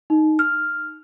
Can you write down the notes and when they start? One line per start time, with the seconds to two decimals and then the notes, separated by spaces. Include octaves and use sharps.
0.10 D#4
0.39 F6